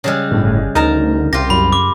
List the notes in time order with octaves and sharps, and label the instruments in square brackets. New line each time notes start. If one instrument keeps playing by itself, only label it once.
[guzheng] C#3 G3 G#3
[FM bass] G1 [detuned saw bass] A2
[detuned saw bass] D2 [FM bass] D#4 [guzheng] A#4 A5 A#5
[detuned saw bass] C2 [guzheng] F4 G4 [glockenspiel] A#6
[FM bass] F#2 [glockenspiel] B5
[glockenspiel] D6